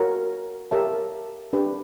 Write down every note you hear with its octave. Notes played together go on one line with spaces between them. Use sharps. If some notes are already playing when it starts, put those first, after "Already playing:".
Already playing: F#4 A#4 C#5 F#5
G4 A#4 C#5 E5 A5
D4 G4 B4